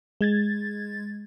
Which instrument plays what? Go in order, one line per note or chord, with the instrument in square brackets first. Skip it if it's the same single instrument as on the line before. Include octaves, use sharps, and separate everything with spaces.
[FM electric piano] G#3 G#6 A6